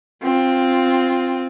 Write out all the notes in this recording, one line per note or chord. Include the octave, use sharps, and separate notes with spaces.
C4 F4